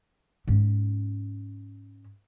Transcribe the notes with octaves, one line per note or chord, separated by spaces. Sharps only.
G#2 C#4